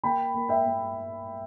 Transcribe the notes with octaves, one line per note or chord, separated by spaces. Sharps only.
A#3 G5 B5
A#3
E5 G5
A#3